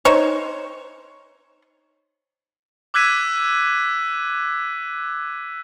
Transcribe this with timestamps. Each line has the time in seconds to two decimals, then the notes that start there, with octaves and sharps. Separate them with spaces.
0.05 D#4 C5 C#5
2.94 D6 E6 F#6 G#6 B6 D#7